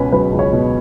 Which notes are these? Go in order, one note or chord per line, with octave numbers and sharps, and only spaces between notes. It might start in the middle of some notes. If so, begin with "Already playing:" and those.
Already playing: C#2 B2 C#4 B4
F#3 B4
C#2
C#5
B2